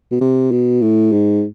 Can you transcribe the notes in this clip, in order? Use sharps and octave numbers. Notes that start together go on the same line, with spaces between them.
B2
C3
B2
A2
G#2